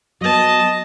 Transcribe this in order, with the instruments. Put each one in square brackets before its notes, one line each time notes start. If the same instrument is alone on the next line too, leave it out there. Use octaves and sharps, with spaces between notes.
[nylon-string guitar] F#3 B3 [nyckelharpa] D#5 A5